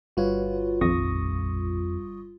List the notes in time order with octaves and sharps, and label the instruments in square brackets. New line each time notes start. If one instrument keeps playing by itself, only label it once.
[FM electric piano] G1 G3 F4 [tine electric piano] F#4 B4 C#5
[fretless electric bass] A#1 D#3 F3 [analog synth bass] F2 [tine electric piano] C#6 D#6 A#6